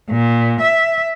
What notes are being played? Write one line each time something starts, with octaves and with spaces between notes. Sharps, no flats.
A#2
E5